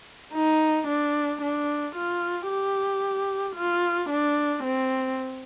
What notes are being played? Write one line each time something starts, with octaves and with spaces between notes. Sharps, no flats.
D#4
D4
D4
F4
G4
F4
D4
C4